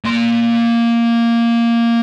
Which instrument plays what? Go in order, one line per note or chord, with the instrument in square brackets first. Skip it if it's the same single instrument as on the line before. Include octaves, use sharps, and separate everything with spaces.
[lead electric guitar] A#3 C6